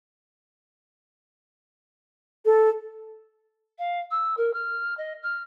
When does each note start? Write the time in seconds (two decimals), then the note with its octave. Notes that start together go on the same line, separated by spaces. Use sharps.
2.45 A4
3.79 F5
4.11 E6
4.37 A#4
4.54 F6
4.97 D#5
5.23 F6